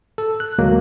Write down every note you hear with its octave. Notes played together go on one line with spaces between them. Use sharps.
A4
F#6
D2 F#3 G#3 A#3